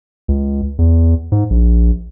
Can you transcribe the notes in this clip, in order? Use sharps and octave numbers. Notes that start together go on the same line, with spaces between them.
C#2
E2
G#2
A#1